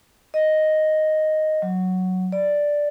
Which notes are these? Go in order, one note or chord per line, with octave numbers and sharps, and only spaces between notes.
D#5
F#3
D5